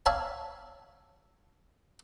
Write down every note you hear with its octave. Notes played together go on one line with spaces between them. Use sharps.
C#5 D5 E5 F5 G#5 A5